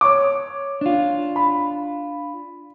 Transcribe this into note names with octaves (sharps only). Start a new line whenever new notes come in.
C#5 C#6 D6
D4 F4
B5